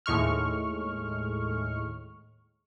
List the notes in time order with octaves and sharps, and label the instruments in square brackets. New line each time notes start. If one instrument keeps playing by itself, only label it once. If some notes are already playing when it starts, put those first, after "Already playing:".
[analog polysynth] D#2 A2 G#3 C#6 F6